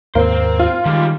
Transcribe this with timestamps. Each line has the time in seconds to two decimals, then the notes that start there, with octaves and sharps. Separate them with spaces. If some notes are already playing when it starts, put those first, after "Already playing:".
0.15 D#2 G#2 A#3 C4 C5
0.59 F4
0.86 D#3 G3 G#3